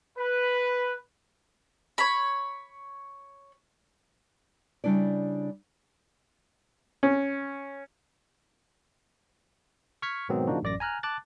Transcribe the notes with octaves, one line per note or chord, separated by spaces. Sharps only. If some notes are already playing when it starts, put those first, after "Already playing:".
B4
C#5 B5
C#3 G3 D4 E4 D5
C#4
C#6 F6 G#6 B6 C#7
G#2 B2 D#3 F#3 B3 C4
C#3 F3 A#3 D4 D#4 F#4
A1 F#2 D5 D6 A#6
G#5 A#5 F6 F#6
A5 D6 F#6 A6